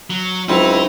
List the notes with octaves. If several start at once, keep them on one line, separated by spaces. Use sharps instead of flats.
F#3
C#2 F#3 C4 D#4 E4